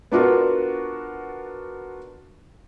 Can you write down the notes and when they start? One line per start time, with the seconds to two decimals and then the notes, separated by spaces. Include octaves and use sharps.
0.12 B3 D4 F4 F#4 A#4